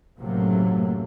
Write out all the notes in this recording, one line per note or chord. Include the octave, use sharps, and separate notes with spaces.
F#1 A2 C3 F#3 A3 A#3